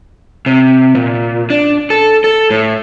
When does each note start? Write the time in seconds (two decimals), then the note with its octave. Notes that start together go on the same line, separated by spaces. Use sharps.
0.46 C3
0.95 A#2
1.50 D4
1.90 A4
2.24 A4
2.50 A2